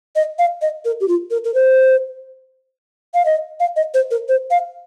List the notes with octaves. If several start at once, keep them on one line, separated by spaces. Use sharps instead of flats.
D#5
F5
D#5
A#4
G4
F4
A#4
A#4
C5
F5
D#5
F5
D#5
C5
A#4
C5
F5